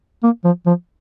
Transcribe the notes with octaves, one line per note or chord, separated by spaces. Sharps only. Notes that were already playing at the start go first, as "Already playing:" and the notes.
A#3
F3
F3